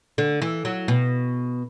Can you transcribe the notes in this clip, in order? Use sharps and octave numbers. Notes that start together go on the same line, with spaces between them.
D3
E3
F#3
B2